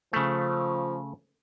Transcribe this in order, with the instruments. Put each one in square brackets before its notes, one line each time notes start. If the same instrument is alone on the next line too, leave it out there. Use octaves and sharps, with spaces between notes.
[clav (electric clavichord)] C#3 A3 [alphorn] F3